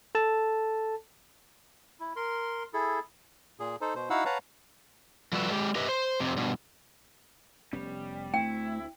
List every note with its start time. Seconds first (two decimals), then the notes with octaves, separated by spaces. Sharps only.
0.15 A4 A5
2.00 E4
2.16 A#4 C6
2.74 E4 G#4 A4
3.60 A#2 G#4
3.81 D#4 A4 C5
3.95 B2 C5
4.10 D#4 E4 F#4 F5 F#5 E6
4.25 B4 C#5 F5 F#5 A5 A#5
5.33 F3 G3 A3 F#4 B4 E5
5.50 G#3 G4
5.75 G4 B4 D#5 E5
5.89 C5
6.20 F2 C3
6.37 G2 B2
7.73 F1 G3 B3 C#4
8.34 D2 A3 C4 E4 G5